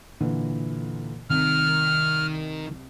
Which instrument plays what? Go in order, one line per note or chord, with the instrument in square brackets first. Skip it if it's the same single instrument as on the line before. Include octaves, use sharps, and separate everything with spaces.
[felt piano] A#2 D3 E3
[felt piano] C2 [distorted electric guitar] D#3 [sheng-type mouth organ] F6